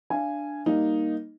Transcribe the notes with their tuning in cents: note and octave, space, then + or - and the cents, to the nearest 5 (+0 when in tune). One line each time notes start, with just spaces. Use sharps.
D4 +0 F5 -30 G#5 +0
G3 +0 A#3 +0 D#4 +0